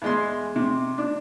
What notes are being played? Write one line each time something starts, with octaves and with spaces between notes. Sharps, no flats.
E2 G#3 C6
C3
D4